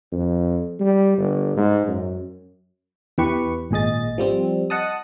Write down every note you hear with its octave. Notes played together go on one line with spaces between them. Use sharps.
F2
G3
G1
G#2
F#2
E2 E3 G4 B4 C#6
G#1 A#2 G#4 D#5 A6
F3 G3 C4
D#5 F#5 A5 D#6